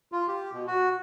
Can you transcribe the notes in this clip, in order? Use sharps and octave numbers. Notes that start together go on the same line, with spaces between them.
F4
G4
B2
F#4